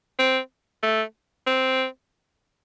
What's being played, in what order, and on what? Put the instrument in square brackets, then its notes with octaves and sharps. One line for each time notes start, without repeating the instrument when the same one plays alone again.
[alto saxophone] C4
A3
C4